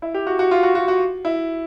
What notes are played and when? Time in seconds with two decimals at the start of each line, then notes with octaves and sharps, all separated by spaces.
0.02 E4
0.14 G4
0.27 F#4
0.39 F#4
0.51 F4
0.63 F#4
0.75 F#4
0.88 F#4
1.25 E4